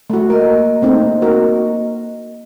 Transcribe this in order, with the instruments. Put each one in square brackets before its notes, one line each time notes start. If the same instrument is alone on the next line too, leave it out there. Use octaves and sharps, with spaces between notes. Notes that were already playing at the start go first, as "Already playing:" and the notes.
[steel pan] A3 F#4
[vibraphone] A#3 D#5 [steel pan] A#4
[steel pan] A3 C4 D#4
F#4 A#4